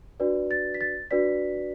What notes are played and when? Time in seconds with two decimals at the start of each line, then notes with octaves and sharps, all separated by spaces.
0.20 D4 F#4 B4 D5
0.51 A6
0.74 B6
0.81 A6
1.11 D4 F#4 B4 D5 B6